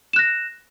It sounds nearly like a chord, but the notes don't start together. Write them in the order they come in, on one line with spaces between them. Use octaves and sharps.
E7 F#6 A#6